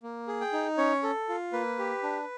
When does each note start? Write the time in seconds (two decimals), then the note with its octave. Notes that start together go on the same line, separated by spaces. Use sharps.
0.03 A#3
0.28 G#4
0.41 G5
0.53 D#4
0.78 C#4 C#5
1.03 A4
1.29 F4
1.53 A#3 B4
1.79 G4
2.03 D4